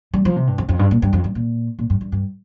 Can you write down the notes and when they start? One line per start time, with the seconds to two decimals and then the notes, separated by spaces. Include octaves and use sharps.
0.14 G3
0.25 F3
0.36 C3
0.47 G2
0.58 F2
0.69 F2
0.79 G2
0.91 A#2
1.02 G2
1.13 F2
1.24 G2
1.35 A#2
1.79 A#2
1.90 G2
2.01 G2
2.12 G2